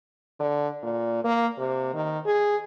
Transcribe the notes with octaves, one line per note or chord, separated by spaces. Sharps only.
D3
A#2
A#3
C3
D#3
G#4